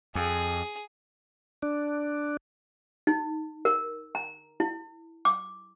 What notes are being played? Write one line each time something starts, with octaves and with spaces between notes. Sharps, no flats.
F2 G#4
D4
D#4
A#4
A#5
E4
D6